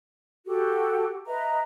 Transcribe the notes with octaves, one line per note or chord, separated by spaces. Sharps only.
F#4 G4 A4
B4 D#5 E5 A#5